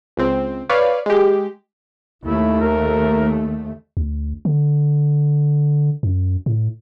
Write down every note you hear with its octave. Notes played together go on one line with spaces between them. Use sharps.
C#2 C4
B4 C#5 D5 F5
G#3 G4
D#2 A3 E4
A#4
D2
D3
F#2
A2